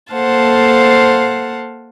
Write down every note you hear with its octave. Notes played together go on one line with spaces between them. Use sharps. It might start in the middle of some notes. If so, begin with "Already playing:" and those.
A#3 A4 C5 F5 F#5 A5